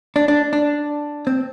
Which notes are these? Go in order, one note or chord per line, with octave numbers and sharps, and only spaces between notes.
D4
D4
D4
C4